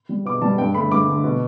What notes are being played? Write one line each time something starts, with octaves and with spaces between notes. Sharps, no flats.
G3
B2 D6
G3 A5
G2 G5
D3 A3 B5
G2 D6
D3 A3
B2